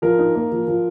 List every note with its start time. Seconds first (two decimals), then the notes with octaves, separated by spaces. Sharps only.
0.02 F3 A#4
0.19 D#4
0.35 A#3
0.52 F3
0.68 F3